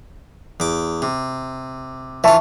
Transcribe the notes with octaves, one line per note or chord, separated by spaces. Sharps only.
E2 D6
C3
E3 F4 E5 A5 C#6